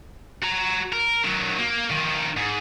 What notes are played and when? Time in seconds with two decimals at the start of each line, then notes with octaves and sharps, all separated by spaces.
0.42 F#4 A#5
0.93 A#4
1.24 D#3 F#3
1.58 A#3
1.91 D#3 F3
2.37 G#2